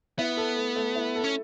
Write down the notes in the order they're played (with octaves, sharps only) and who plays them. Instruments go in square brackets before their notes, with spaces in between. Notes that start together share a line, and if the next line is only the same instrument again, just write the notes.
[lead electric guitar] B3 [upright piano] E4
[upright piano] A4
A3
A3
E4
A4
[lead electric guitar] C#4